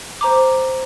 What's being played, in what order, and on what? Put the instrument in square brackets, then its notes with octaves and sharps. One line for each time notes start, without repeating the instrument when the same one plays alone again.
[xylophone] C5 A#5 D6